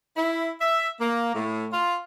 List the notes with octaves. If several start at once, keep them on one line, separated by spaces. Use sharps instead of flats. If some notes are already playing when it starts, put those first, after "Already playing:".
E4
E5
A#3
A2
F4